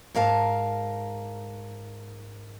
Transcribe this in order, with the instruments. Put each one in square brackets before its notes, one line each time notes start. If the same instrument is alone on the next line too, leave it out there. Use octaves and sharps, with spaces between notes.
[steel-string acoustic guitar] G#2 A#4 F5 A5